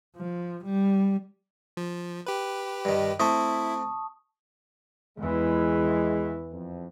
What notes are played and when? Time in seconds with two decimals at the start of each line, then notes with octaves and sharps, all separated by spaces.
0.17 F3
0.65 G3
1.77 F3
2.26 G4 B4
2.85 G2 D#3
3.20 A3 C4 E4 A4 A5 C#6 D#6
5.19 E2 E3 G#3
6.52 F2